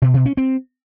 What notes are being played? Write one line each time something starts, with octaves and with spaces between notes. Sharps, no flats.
B2
B2
C#4
C4